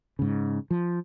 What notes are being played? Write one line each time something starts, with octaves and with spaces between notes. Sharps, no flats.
G#2 C#3
F3